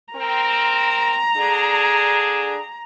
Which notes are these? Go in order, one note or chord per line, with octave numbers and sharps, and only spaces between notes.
C4 A#4 A#5
D3 D4 G#4